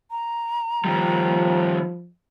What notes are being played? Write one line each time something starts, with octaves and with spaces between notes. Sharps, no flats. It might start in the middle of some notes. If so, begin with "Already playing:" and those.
A#5
D#3 F3 G3